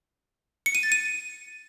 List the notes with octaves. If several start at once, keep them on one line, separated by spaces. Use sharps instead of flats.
C#7
D#7
A6
D#7